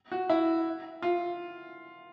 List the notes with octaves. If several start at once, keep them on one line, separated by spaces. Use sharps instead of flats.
F#4
E4
F4